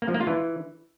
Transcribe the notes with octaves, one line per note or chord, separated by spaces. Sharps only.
A#3
F3
A#3
F4
E3